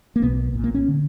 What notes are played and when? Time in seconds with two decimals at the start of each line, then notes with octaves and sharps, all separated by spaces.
0.16 A#3
0.22 B1 B2 B3
0.53 A#1 A#2
0.64 A#3
0.74 C#4
0.88 D3